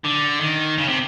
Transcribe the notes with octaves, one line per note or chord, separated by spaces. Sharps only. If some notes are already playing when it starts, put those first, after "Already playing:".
D3
D#3
C#3
C3